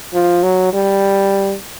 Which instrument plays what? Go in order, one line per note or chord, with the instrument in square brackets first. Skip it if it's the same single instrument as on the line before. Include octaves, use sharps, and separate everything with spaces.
[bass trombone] F3
F#3
G3